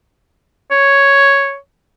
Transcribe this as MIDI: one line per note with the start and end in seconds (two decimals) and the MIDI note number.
0.71 1.57 73